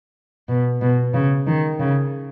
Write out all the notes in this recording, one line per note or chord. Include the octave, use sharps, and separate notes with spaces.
B2
B2
C#3
D#3
C#3